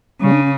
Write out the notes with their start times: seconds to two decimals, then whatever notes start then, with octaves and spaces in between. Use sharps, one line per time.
0.21 C#3 G3
0.32 D4
0.42 C#4